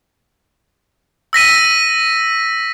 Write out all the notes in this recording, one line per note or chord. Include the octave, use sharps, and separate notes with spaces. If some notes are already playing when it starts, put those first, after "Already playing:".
E6 A#6 B6 D#7